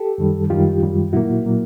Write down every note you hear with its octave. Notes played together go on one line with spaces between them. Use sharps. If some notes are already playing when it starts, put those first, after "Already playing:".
Already playing: G4 A4
F#2 D#3 G3
F#2 D#3 G3 F4 G4
F#2 D#3 G3
A#2 F#3 A#3 E4 F#4
A#2 F#3 A#3